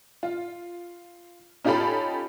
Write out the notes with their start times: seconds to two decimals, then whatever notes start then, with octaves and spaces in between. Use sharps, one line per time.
0.23 F4
1.64 C#4 D#4 F4 G4 A4 B5